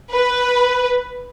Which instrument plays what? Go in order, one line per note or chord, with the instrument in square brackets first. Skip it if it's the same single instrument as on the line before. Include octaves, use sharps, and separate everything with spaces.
[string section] B4